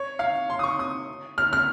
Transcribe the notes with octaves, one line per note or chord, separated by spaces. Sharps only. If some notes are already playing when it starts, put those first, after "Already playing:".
Already playing: C#5
F5
C6
D#6
C#6
D#6
F6
F6